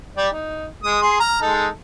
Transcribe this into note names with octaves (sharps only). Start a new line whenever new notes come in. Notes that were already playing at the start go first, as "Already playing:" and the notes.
G3 G4 D5
D#4
G#3 D#6
G#4 C6
A#5 F6
G#3 D#4 A4